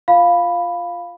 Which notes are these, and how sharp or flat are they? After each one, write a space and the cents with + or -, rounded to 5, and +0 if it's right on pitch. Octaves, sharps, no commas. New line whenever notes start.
F4 +0 F5 +0 B5 +0